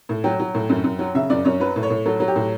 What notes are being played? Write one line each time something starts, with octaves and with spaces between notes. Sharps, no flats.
A2
F#3 G5
F#3
A2
F#2
F#2
F#3
C#3 E5
F#2 D5
F#2 C#5
F#3 B4
A2
C#5
A2
F#3 A4
F#3
G4
A2